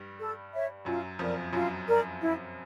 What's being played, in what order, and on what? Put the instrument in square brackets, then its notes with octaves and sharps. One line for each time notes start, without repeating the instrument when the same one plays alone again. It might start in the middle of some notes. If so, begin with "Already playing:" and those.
Already playing: [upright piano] G2 G3
[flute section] A4
C#5 E5
[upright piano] F#2 F#3 [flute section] F4
[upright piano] F2 F3 [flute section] A#4 D5
[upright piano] F#2 F#3 [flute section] F4
[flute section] A#4 D5
E4